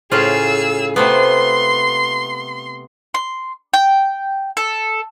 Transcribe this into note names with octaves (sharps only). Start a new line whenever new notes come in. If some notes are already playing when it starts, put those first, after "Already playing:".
A2 C#3 F4 G#4 E6
C3 A3 B3 C6
C6
G5
A4